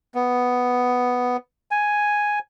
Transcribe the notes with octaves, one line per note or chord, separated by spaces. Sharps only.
B3
G#5